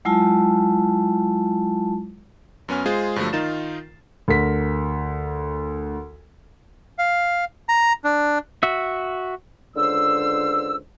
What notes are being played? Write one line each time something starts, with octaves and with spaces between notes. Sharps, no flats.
F#3 G#3 E4 F4 A5
F#2 B3 C#4 G#5 F6
G#3 F4 G#4 C5 C7
G2 D3 F3 F#3 A3
D#3 D#4 F4 A#4 A6 E7
D2 A#4 B6
F5
A#5
D4
F#4 E5
C#2 D3 C5 E6